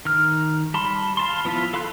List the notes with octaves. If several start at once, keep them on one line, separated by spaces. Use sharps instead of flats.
D#3 F6
G3 A5 B5 C6
F5 A5 C6
F3 B3 E4 F4 B4
A4 F5 B5 C6 F#6